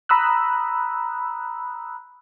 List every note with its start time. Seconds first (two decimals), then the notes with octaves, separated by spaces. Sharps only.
0.09 A#5 B5 D#6 E6 F#6